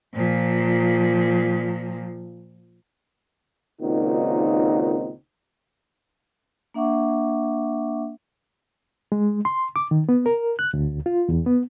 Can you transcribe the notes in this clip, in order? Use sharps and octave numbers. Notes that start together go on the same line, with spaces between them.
A#2 F3
C#2 A#2 D#3 C4 D#4 F#4
A#3 D4 E5 F#5 C#6 D6
G#3
C6
D6
D#3
B3
A#4
F#6
D2
F4
E2
B3